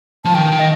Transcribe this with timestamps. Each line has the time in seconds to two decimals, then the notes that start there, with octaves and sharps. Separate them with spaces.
0.25 F3 A5
0.35 D#3 G5
0.52 D#3
0.59 D#5